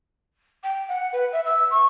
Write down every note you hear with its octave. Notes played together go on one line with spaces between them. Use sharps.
G5
F#5
B4
E5
E6
C#6